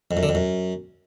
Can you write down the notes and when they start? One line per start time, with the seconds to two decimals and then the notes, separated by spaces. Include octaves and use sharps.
0.11 F2
0.17 F#2
0.23 D3
0.29 F2
0.35 F#2